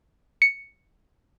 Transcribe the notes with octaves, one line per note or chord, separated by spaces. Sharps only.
C#7